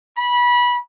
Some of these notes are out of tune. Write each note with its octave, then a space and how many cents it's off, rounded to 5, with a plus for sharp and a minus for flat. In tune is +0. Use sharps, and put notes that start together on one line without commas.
B5 -20